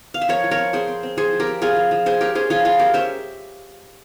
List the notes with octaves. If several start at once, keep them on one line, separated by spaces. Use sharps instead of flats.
F5
E5
F3 A#4 C#5
F3
A#4 C#5
C4
C4 G#4 C5
C4
C4
F3 G#4 C5
F3
G4 A#4
C4
C4 F4 G#4
F3
F3
G#3 G#4 C5
C#4 G4 A#4
C#4 G#4 C5
F3 F4 G#4
G#3 F4 G#4
G#3 G4 A#4
C#4 C5 E5